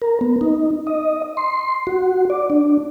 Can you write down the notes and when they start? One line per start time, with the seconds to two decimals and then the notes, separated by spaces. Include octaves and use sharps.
0.02 A#4
0.21 B3
0.41 D#4
0.87 D#5
1.37 C6
1.87 F#4
2.30 D5
2.50 D4